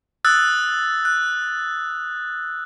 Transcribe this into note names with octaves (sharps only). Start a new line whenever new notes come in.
D#6 E6 F#6 A6
F#6